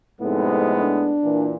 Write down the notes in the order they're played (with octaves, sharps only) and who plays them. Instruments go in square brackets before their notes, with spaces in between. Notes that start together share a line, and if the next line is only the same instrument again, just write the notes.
[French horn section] F2 C3 D#4 [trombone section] A2 G#3 B3
[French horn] D4
[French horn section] A#2 E3